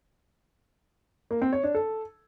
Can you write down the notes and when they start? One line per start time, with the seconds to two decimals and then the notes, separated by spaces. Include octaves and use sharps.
1.31 A#3
1.42 C4
1.53 C#5
1.64 D4
1.75 A4